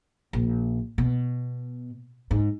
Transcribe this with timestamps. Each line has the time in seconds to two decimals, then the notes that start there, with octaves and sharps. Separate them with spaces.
0.33 A#1
0.98 B2
2.31 G#2